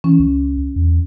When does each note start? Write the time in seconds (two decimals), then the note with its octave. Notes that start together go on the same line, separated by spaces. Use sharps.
0.04 E3 C#4
0.19 C#2
0.76 E2